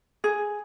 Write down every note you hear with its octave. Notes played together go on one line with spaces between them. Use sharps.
G#4